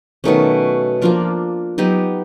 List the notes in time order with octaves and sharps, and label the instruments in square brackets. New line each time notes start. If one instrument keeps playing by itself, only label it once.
[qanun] B2 F#3 A3 C#4 [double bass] D#3
[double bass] F3 [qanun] A#3 D4 F4 A#4
[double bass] F#3 [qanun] B3 D#4 G4